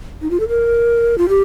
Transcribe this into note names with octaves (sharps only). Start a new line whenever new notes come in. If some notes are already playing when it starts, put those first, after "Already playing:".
D#4
F4
A4
A#4
F4
G4